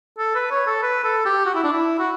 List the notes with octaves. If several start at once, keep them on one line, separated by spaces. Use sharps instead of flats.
A4
B4
C#5
A4
B4
A4
G4
F#4
E4
D4
E4
F#4